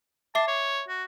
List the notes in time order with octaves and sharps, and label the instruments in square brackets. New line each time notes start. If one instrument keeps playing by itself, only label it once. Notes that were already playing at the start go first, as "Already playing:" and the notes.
[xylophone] E5 D6 C7 [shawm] A5
[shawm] C#5
F#4